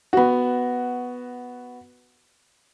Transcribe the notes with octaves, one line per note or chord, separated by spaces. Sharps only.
B3 F#4